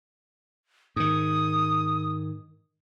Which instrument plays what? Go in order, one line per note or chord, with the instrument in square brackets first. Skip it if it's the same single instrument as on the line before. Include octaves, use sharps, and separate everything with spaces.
[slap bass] G#2 D#3 [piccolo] D#6